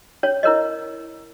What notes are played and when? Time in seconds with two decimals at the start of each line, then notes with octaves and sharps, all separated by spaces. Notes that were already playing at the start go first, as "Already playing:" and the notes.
0.23 C#4 C#5
0.43 E4 A#4 C#5 D#5